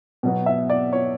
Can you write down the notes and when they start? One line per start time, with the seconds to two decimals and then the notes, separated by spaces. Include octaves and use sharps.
0.23 B2 F#3 B3
0.46 E5
0.70 D5
0.93 C#5